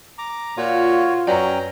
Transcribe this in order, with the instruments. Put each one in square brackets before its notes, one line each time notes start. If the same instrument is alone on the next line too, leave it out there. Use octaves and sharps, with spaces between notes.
[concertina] A#5 D6
[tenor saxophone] A#2 [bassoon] F4 [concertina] F#4 C#5
[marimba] F#2 B4 D5 [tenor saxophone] F#3 [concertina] C#4 G5 A#5